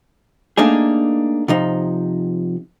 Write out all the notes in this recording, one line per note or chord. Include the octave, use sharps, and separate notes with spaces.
A3 A#3 D4 D#4 G#4
C3 F3 D#4